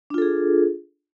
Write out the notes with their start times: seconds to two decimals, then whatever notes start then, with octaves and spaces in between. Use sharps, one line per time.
0.10 D4
0.14 F4
0.18 A4
0.22 G#4